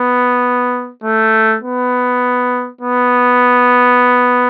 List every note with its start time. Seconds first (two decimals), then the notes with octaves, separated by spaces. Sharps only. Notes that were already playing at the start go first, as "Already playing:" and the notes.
Already playing: B3
1.03 A3
1.63 B3
2.81 B3